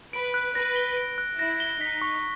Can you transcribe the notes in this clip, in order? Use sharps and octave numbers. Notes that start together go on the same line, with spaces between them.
B4 D7
F#6
B4 A#6
G7
D7
F#6
E4 A#6
G7
D#4 B6
C#6